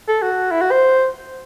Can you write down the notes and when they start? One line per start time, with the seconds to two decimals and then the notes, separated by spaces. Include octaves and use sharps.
0.08 A4
0.22 F#4
0.51 E4
0.61 F#4
0.71 C5